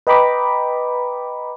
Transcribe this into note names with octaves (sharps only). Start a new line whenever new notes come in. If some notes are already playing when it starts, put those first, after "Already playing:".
B4 D#5 G5 A#5 B5 D6